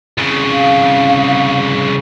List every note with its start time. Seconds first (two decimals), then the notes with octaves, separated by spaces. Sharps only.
0.18 C2 C#3
0.52 F5